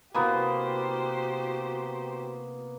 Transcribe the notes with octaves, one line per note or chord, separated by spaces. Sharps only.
C3 A#3 B3 E4 F#4 G4 C5 G#5